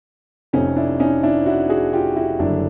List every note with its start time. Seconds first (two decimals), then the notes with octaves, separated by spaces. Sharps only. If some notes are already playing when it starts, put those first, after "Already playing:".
0.53 F1 F2 C3 C#4 D#4
0.76 D4 E4
1.00 C#4 D#4
1.23 D4 E4
1.46 E4 F#4
1.69 F#4 G#4
1.93 F4 G4
2.16 E4 F#4
2.39 F#1 F#2 D3 G3 D4 E4